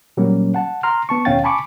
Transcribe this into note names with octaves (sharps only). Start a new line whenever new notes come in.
A#2 F#3 G3 A#3 C#4
F#5 A5
A#5 C6 F6
B3 A5 C#6
D#2 B2 C#4 F5 G5 A6
G#5 A5 B5 C#6 D6